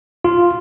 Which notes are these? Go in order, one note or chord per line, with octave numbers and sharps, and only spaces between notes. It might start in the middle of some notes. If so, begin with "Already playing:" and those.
F4